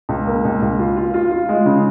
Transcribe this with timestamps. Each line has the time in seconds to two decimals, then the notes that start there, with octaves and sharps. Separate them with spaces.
0.09 C#2
0.27 A#3
0.45 C#2
0.62 C#2
0.79 F4
0.96 F4
1.14 F4
1.31 F4
1.49 G#3
1.66 C#3